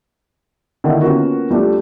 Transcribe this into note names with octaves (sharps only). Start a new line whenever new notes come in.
D3 D#3 A#3 D#4 E4 F#5
A#3 B3 C#4 F4 F#4 A#4
F3 G3 A3 D4